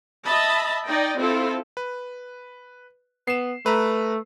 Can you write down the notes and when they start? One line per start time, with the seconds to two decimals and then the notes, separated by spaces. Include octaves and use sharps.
0.24 D#5 E5 A5 B5
0.85 D#4 D5 D#5 G5
1.17 C4 E4 F4 A4
1.77 B4
3.27 B3 C7 E7
3.66 A3 B4 A#5